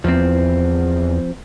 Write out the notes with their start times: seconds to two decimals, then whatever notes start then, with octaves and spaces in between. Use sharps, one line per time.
0.04 E2 F3 C4